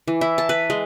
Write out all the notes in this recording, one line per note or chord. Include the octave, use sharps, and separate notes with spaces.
E3
E4
A5
B4
G#3